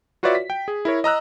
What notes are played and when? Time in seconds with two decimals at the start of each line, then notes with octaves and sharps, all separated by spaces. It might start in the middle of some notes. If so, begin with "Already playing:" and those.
0.23 F4 F#4 B4 C#5 D5 E5
0.35 B6
0.50 G5
0.68 G#4
0.85 E4 A#4 C#5
1.04 D#5 A#5 E6 F#6